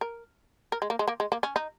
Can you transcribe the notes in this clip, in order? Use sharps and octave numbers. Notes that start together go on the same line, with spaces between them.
A#4
A#4
G#3
A#3
G#3
A#3
G#3
A#3
C#4
D#4